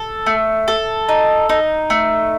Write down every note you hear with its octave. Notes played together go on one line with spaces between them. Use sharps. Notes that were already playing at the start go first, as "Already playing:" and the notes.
Already playing: A4
A3
A4
D#4
D#4
A3